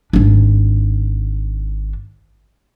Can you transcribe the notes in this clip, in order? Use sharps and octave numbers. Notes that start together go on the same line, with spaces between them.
G#1 D4